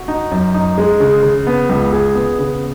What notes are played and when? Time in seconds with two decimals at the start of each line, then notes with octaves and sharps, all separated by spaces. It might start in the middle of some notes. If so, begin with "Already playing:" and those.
Already playing: F#4
0.08 D#4
0.31 F#2
0.54 D#4
0.78 G#3
1.00 C#3
1.23 C#3
1.47 B3
1.69 C#2
1.93 G#4
2.15 B3
2.39 C#3